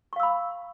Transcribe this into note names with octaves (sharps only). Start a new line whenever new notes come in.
F5 B5 C#6 E6